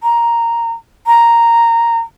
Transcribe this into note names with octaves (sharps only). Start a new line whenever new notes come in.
A#5
A#5